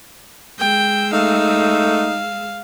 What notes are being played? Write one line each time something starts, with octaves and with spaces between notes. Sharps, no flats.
G#3 G5 E6
A3 D#4 F5